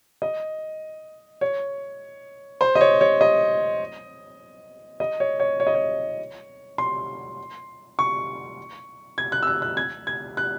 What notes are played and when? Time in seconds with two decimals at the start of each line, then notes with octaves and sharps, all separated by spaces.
0.22 D#5
1.41 C#5
2.61 C5
2.75 D#5
2.81 C#5
3.01 C#5
3.21 D#5
5.00 D#5
5.20 C#5
5.40 C#5
5.60 C#5
5.67 D#5
5.75 C#5
6.78 C6
7.99 C#6
9.18 G#6
9.32 F#6
9.43 E6
9.47 F#6
9.62 F#6
9.77 G#6
10.07 G#6
10.37 F#6